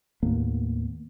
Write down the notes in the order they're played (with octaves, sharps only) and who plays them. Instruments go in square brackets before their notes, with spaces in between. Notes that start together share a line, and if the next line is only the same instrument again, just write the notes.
[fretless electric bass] D#2 A2 A#3 B3